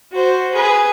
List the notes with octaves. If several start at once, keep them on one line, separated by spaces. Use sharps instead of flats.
F#4 C5
G#4 B4